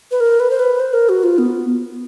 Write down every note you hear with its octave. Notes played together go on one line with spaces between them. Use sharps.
B4
A#4
B4
C5
B4
C5
A#4
F#4
F4
B3